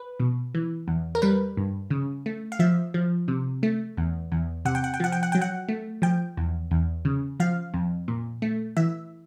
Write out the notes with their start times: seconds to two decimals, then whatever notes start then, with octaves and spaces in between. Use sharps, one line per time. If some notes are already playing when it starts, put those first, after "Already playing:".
Already playing: B4
0.20 B2
0.55 E3
0.88 E2
1.15 A#4
1.22 G3 B4
1.57 G2
1.90 C#3
2.26 A3
2.52 F5
2.59 F3 E5
2.94 F3
3.28 C3
3.63 A3
3.97 E2
4.32 E2
4.65 C3 F#5
4.75 G5
4.84 F#5
4.94 G5
5.00 F3 F#5
5.12 G5
5.23 F#5
5.32 F#3 G5
5.42 F#5
5.68 A3
6.02 F3 G5
6.37 E2
6.71 E2
7.05 C#3
7.40 F3 F5
7.74 F2
8.08 A#2
8.42 A3
8.77 E3 E5